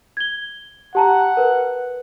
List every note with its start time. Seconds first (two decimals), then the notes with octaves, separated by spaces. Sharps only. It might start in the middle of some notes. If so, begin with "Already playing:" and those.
0.17 G#6 G7
0.95 G4 F#5 A5 A#5
1.37 A#4 B4